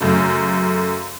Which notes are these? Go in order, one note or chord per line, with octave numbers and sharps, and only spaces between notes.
F#2 C#3 A3